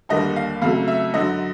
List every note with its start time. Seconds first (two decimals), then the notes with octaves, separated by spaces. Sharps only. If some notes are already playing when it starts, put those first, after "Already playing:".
0.09 D#2 D3 G3 A#3 D#5
0.36 F5
0.62 F2 C#3 F#3 A3 F5
0.87 E5
1.13 F#2 D3 F#3 D#5